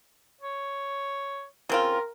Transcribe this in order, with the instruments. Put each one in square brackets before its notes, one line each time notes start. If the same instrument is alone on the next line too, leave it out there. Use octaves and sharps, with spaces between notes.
[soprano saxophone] C#5
[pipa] C#3 C4 F4 [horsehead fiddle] A#4